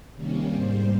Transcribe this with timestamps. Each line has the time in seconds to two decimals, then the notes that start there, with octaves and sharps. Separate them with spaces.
0.15 C3 D#3 G3 A#3 C#4
0.51 G#2 G3 A#3 C5